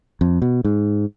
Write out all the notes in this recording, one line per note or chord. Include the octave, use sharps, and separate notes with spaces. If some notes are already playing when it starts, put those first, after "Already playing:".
F2
B2
G#2